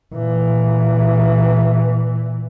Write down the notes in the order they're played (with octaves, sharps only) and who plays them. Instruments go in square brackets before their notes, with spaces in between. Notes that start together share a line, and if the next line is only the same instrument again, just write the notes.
[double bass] A#2 E3